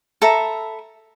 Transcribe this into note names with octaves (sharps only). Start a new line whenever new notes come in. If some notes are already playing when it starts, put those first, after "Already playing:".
A4 E5 A#5 B5